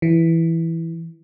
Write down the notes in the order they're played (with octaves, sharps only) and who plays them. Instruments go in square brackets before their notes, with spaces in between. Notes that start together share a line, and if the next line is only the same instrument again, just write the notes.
[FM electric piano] E3